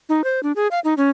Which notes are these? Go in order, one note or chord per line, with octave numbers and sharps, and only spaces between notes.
D#4
C5
D4
G#4
F5
D#4
C#4